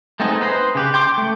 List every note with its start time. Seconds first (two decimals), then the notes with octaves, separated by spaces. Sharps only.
0.20 A3 B3 C4 D#4 G#4
0.41 D#4 B4 C5 C6
0.75 C#3 G4 B4
0.94 G5 C6 D6
1.18 A3 G5